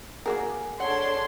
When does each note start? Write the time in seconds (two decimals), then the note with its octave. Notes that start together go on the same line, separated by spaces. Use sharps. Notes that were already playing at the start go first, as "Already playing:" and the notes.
0.26 A#3 F#4 G#4 A#4
0.80 D4 A4 C#5 F#5 C6